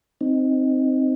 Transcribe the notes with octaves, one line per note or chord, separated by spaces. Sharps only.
C4 D#4